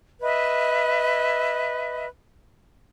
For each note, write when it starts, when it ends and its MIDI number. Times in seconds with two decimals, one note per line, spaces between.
0.22 2.06 71
0.22 2.06 75
0.22 2.06 76